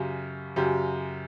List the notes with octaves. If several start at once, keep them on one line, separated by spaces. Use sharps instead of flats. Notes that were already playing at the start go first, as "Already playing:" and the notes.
Already playing: F#2 C#3 F#3 G4
F#2 C#3 F#3 G4